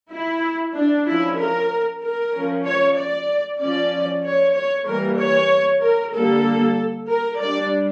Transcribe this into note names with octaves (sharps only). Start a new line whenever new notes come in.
E4
D4
F3 C#4 E4
A#4
A#4
F3 C#4
C#5
D5
F3 C#4 D5
C#5
C#5
E3 G3 A#3 A#4
C#5
A#4
D3 G3 A#3 A4
A#4
G3 D4 D5